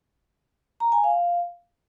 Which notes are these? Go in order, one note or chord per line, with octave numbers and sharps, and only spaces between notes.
A#5
G#5
F5